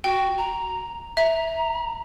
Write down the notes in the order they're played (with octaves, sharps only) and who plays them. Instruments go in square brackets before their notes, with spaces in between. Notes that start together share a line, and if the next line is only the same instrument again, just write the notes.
[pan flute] F#4 [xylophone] G5
[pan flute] A#5
[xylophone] E5 [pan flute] A#5